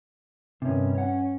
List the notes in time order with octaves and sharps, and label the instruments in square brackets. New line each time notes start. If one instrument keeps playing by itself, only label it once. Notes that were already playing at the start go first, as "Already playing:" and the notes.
[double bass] G2 D#3 [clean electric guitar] C3 C#4
[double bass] C#4 [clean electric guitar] C#5 F#5